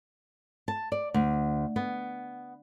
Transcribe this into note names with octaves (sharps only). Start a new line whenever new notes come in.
A5
D5
D2
B3